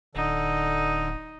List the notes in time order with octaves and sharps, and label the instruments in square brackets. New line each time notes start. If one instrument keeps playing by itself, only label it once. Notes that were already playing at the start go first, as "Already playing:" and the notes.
[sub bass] D1 [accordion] D3 [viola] D#4